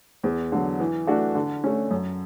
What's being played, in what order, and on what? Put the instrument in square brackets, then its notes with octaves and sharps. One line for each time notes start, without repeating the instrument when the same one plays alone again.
[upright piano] E2
D3 F#3
E3
A3 D4 F#4
D3
A3 C#4
F#2